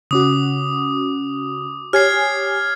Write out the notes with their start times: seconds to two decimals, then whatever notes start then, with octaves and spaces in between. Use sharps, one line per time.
0.11 C#3 C#4 F#4 D6 D#6
1.93 G4 C#5 G#5 F6 G#6 C7